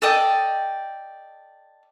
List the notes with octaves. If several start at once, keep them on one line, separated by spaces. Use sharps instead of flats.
A4 D5 D#5 G5